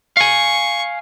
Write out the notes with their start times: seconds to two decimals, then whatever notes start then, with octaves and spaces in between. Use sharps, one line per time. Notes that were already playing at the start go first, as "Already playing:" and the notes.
0.17 F5 G#5 C#6